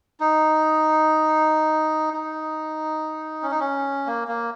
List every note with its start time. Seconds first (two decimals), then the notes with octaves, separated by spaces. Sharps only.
0.20 D#4
2.13 D#4
3.43 C#4
3.51 D#4
3.60 C#4
4.07 A#3
4.28 A#3